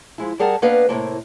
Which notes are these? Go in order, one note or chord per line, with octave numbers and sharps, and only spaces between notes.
F3 G#3 E4
G3 G#4 A#4 F#5 A5
A#3 B3 D4 B4 D#5 F5
A2 C3 F3 A#3